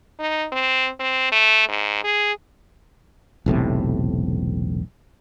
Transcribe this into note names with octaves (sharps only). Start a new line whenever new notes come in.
D#4
C4
C4
A3
G#2
G#4
E1 B1 A2 C3